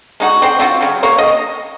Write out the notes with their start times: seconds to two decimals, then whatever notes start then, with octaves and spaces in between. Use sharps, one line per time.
0.20 G#3 D#4 F#4
0.42 C4 C5 G5
0.59 C4 F4 F#4
0.80 C#3 F#3
1.03 C3 A#3 C#5 C#6
1.18 D#5